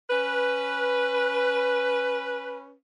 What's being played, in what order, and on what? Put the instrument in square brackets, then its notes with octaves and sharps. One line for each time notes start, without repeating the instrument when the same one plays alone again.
[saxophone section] C#4 B4